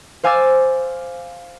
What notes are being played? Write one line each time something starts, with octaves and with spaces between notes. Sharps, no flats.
C5 F5 G#5 D6 E6 A6